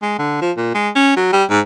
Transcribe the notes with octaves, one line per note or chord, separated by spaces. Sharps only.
G#3
D3
F3
A#2
G#3
C#4
F#3
G3
G#2